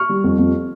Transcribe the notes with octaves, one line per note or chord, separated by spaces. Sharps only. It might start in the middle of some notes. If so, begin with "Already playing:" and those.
Already playing: C#6 F6
G3
F2
F2